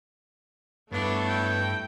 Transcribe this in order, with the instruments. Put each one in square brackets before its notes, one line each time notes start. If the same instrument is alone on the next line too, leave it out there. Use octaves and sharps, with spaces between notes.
[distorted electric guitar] G2 [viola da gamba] A3 E4 A4 [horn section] B3 C#5 [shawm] D4
[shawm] G5